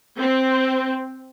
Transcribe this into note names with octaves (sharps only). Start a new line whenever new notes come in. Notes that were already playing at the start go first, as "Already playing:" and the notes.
C4